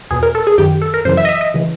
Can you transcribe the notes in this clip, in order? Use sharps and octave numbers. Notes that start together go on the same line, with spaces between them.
E2 B2 G#4
A#4
A4
G#4
F#2 D#3 G4
A4
A#4
F#2 C#3 E3 C5
E5
D#5
E5
D#5
C#3 E3